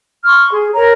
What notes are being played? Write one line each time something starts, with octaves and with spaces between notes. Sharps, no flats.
C6 C#6 F6
G#4
A#4 C#5 A#5